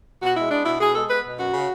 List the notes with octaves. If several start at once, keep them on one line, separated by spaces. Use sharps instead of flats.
B2 F#4
G#3 E4
B3 D4
B2 E4
B2 G#4
G#3 A4
B3 B4
B2
F#2 F#4
C#3